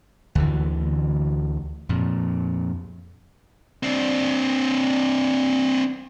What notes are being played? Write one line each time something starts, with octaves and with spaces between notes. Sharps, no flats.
D2 D3 E3
F2 A#2
C4 D4